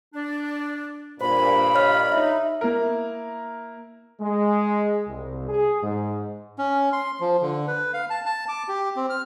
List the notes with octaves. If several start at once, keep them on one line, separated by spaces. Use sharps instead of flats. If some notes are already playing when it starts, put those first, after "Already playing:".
D4
G2 A#2 C5 B5
C#5 D#5 F6
D#4 E5
A#3 E4 A#4
G#3
C2
G#4
G#2
C#4
C6
F3
D3
B4
F5
A5
A5
D6
G4
C4
F6